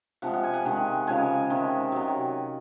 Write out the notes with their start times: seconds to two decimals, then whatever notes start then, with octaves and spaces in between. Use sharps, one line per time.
0.22 C3 F3 G#3 F#5
0.34 F#5
0.43 G#5
0.54 F#5
0.65 C3 D#3 G#3
1.07 C#3 F3 G#3 G#5
1.50 C3 D#3 G#3
1.92 C3 F#3